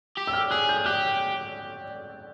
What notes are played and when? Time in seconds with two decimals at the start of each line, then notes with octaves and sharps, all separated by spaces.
0.17 G4
0.27 E6
0.33 F6
0.51 G#4 F#6
0.69 G6
0.86 G4 F#6